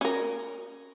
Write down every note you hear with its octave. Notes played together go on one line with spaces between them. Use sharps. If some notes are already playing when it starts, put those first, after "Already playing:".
C#4 A#4